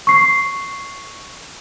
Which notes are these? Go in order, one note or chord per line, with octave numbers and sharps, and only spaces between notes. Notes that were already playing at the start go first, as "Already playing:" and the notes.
C#6 C7